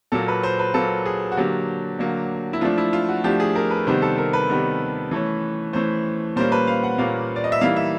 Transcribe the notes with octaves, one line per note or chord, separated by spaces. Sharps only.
A#2 F#3 A#3 A4
B4
C5
B4
A#2 F#3 A#3 A4
G#4
F#4
D3 F#3 A#3 G4
D3 F#3 A#3
E4
F3 A3 D4 F4
E4
F4
F#4
F3 A3 D4 G4
G#4
A#4
B4
C3 D#3 G3 B3 C5
A4
A#4
B4
C3 D#3 G3 B3
E3 A3 C#4
E3 A3 C#4 C5
A#2 G3 A#3 C#4 C5
B4
F5
F#5
A#2 G3 A#3 C#4 F5
D5
D#5
E5
E3 G3 A#3 D#4 F5
E5